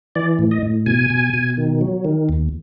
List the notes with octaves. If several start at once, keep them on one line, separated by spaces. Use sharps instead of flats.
E3 D5
A2
D#5
A2
B2 G#5
B2
B2
D#3
F#3
D#3
D#2